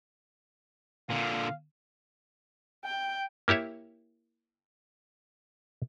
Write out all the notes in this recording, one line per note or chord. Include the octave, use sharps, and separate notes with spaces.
A#2 D3 F5
G5
A#3 E4 G4 C#5 E5